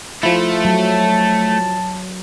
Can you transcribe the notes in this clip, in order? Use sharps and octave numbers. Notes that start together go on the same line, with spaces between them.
F3 A3 E4 F4
F#3 A5